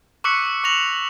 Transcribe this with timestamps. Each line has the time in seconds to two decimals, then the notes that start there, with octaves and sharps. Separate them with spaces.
0.24 C#6 D6 E6 F#6 B6 C#7
0.64 C#6 E6 A#6 F7 F#7